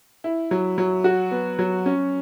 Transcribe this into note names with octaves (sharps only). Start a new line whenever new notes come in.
E4
F#3
F#3
F#4
B3
F#3
C#4